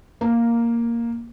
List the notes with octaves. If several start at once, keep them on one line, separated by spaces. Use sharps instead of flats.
A#3